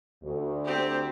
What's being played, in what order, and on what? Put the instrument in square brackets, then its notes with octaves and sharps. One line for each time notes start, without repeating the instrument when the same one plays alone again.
[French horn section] D2
[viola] C4 G4